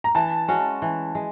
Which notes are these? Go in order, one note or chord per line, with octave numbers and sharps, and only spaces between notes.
A#5
E3 A5
G#3 C#4 F#4
E3
G#3